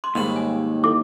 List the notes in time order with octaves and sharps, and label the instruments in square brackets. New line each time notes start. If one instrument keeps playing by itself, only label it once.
[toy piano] C6 D6
[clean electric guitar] D#2 [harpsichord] G#2 G3 B5
[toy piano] G#5
[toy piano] E4 A4 [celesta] D6